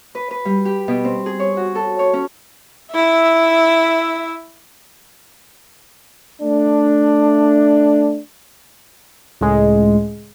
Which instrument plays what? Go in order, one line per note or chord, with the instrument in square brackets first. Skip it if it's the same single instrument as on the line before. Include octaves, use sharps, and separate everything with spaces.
[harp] B4
B4
G3
G4
B2
C4
G#4
C#5
F#4
A4
C#5
C#4
[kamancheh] E4 E5
[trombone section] A3 D4
[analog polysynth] C#2 A2 G#3